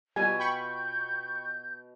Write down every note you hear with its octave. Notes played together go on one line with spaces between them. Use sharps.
B2 G3 F4 G#5
G5 B5 C#6 G6